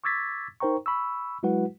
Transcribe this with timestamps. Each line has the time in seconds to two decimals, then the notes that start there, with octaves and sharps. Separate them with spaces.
0.04 C#6 D6 E6 G#6 A6 B6
0.60 D#4 A#4 C5 G5 A#5 C#6
0.86 B5 C#6 E6
1.43 F#3 G#3 E4 F#4 B4 F#5